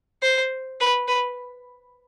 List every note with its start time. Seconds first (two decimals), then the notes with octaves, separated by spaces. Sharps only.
0.22 C5
0.80 B4
1.08 B4